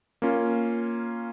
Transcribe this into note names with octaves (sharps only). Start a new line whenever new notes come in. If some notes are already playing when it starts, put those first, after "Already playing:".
A#3 C#4 F4